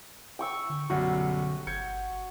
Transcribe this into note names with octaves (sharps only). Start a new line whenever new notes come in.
G5 C#6 E6
D3
B1 F#2 D3 G3 F#4
G1 G6 G#6 C#7